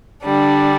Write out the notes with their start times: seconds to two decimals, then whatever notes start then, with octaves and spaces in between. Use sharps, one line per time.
0.24 D3 G3 D4